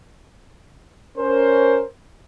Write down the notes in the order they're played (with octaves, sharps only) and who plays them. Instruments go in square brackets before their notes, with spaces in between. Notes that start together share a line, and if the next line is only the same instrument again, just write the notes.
[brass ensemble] C#4 A#4 C5